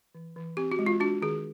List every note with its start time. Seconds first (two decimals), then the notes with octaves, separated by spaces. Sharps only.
0.15 E3
0.36 E3
0.57 C4 G4
0.72 F#4
0.79 G#3
0.86 F4
1.00 D4 F#4
1.22 D#3 G#4